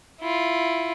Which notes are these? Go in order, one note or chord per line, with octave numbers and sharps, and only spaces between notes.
E4 F4